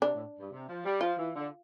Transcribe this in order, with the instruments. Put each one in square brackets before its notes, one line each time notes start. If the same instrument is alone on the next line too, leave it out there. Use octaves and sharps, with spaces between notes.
[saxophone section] C3 [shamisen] D4
[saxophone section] A2
G2
C3
F3
G3
[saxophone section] F3 [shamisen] F4
[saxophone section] E3
D3